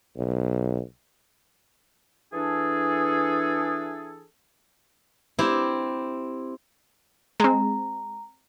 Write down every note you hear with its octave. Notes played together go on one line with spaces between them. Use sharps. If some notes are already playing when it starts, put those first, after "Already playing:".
B1
E3 D4 G#4 A4
C4 E4 G4
G#3 C4 A#5